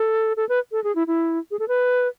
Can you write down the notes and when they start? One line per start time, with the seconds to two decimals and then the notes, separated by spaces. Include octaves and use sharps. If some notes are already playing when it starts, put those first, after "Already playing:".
Already playing: A4
0.37 A4
0.49 B4
0.72 A4
0.84 G#4
0.95 E4
1.07 E4
1.51 G#4
1.59 A4
1.68 B4